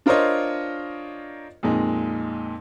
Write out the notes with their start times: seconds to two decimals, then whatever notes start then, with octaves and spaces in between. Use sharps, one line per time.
0.06 D4 F4 A#4 C5 C#5 D#5
1.63 F2 A#2 G#3 D#4